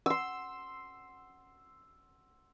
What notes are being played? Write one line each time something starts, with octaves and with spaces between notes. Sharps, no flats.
C6 E6